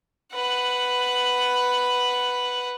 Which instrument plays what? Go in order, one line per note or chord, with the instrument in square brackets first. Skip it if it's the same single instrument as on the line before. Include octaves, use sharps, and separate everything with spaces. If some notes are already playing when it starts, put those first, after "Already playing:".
[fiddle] B4 F#5